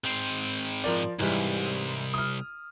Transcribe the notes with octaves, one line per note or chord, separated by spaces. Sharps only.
G#2 C4
F3 A#4 D5
C2 G#2 E3 G3
D#6 F6